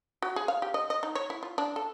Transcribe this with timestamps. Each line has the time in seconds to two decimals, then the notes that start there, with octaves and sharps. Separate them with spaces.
0.22 F#4
0.36 G#4
0.48 F5
0.62 G4
0.74 D#5
0.90 D#5
1.03 D#4
1.15 C#5
1.30 E4
1.43 F4
1.58 D4
1.76 A4